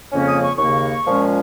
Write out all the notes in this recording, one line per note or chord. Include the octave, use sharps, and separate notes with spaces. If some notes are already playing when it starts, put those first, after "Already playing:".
F2 C#3 A#3 C#4
D#6
C#6
D#2 C#3 A#3 C#6
A#2 F3 G#3 C#4